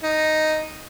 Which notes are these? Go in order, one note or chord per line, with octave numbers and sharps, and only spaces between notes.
D#4